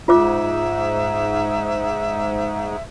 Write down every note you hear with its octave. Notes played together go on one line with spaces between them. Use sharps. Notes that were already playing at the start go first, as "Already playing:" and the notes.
G#2 F4 C5 E5 D6